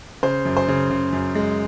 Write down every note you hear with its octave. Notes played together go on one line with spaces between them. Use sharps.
C#3 C5
F#2
C5
C#3
C#3
F#2
G#3